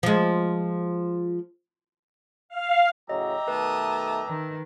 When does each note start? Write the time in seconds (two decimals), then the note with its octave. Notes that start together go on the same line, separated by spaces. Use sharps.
0.03 F3 G#3
2.49 F5
3.09 A2 C#3 F#3 G4 D#5 E5 A#5
3.48 B2 D#3 A3 B4 A5 D#6
4.27 D#3